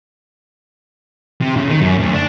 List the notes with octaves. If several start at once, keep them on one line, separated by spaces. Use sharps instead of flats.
C3
C#3
D#3
F#2
D2
D4